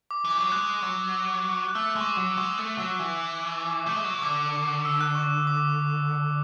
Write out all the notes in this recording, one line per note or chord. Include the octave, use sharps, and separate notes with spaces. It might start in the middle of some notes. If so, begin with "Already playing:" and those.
D6
E3
D6
F#3
G#3 F#6
F#3
F#6
A3 E6
G#3
C#6
D6
F#3
G#3 C#6
A3
F#3
E3
D6
C#6
D6
A3
G#3 C#6
F#3
E3
C#6
D3 D6
D6
E6
F#6
C#6
D6